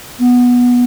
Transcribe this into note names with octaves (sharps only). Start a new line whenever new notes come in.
B3